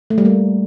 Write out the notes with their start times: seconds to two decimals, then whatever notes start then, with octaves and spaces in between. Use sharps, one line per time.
0.10 A3
0.18 G3
0.25 A#3